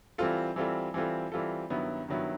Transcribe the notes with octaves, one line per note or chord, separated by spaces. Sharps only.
E3 G3 C4 F4 A4
E3 G3 C4 F4 A4
E3 G3 C4 F4 A4
E3 G3 C4 F4 A4
G2 D#3 F#3 B3 E4
G2 D#3 F#3 B3 E4